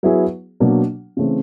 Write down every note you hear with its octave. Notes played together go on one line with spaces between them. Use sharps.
F#3 B3 E4 G#4
B2 F#3 A#3 D4
C#3 E3 A3 C4